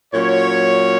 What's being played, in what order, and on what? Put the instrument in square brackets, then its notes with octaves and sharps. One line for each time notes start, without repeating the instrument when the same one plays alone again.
[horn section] A#2 F#3 C#4 C#5